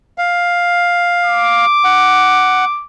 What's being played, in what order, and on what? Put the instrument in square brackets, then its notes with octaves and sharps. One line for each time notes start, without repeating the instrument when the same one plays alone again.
[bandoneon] F5
[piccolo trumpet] D6
[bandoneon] F#5